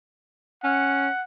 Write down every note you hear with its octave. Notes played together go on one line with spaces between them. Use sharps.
C#4 F#5